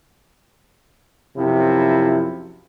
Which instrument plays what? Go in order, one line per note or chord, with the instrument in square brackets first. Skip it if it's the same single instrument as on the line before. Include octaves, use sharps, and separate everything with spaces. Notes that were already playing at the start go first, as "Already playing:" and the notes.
[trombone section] F#2 C3 F3 E4